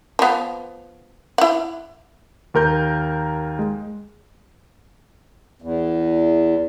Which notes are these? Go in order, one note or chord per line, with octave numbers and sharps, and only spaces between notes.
F3 B3
E4 F#5
D#2 A#4 G6
G#3
E2